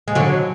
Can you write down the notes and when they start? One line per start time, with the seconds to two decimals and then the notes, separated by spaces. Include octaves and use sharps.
0.08 G#3
0.15 D3 F#3